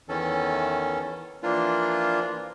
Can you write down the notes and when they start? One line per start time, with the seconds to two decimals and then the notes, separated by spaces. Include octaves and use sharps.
0.09 E2 D#3 E3 C#4 A4
1.43 E3 F3 A#3 D4 F4